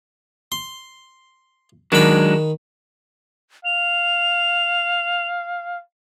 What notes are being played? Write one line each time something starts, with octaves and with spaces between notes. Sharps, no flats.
C6
D#3 F#3 G#3 D4 B5
F5 F7